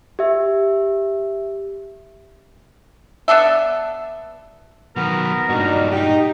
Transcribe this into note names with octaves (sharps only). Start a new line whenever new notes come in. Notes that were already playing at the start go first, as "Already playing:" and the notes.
G4 E5
B3 D4 A4 E5
D#3 F#3 B3 A#4
G2 A#2 D4 D#4 F#4
D#4 G4